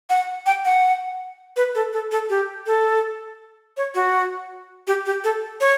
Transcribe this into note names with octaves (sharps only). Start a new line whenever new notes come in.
F#5
G5
F#5
B4
A4
A4
A4
G4
A4
C#5
F#4
G4
G4
A4
C#5